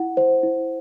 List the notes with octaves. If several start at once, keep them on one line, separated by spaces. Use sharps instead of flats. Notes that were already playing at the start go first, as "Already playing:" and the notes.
Already playing: E4 F#5
C5
E4